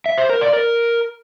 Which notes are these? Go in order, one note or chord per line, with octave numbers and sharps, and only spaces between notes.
E5
C5
A#4
D5
A#4